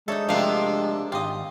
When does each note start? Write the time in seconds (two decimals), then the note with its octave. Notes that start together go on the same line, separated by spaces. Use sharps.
0.08 G#3 D4 D#4 A4 C#5 E5
0.29 C3 F3 A3 A#3 C4 D4 F5
1.12 G#1 F4 G4 D#5